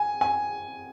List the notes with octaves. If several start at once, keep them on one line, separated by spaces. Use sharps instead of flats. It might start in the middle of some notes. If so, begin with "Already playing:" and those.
Already playing: G#5
G#5